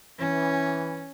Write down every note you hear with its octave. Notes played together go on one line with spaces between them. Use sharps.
E3 C#4